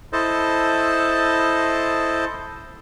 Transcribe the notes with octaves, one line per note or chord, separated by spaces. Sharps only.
E4 A4 C5 D#5 A5